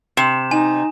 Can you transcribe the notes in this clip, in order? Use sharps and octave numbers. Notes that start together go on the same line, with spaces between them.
C3 E7
D#4 G#5